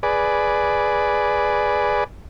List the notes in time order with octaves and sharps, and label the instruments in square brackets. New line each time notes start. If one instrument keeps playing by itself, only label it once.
[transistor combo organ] G#4 B4 D5